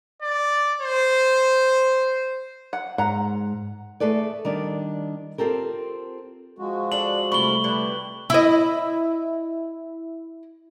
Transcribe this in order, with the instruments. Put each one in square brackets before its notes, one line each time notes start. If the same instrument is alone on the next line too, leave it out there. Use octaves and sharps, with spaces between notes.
[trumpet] D5
C5
[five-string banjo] F#5
[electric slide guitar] G#2 [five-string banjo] F#5 A#5
[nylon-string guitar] A3 G#4 A4 B4 D5
D#3 G3 D4
C4 F4 G4 A4 A#4
[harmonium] F3 G#3 F#4
[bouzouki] D4 A4 [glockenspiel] F#7
[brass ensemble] C3 G3 A3 [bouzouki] E4 F4 [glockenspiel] C#6 G7
[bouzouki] D3 E4 [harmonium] G4 B4
[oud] E4 D#5